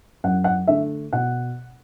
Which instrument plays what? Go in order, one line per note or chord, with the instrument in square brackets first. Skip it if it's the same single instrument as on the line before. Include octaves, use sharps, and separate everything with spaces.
[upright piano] F#2 F#5
F#5
D3 A3 E5
B2 F#5